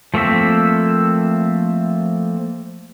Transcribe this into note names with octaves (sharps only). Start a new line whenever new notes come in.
F3 A3 A#3 C4 E5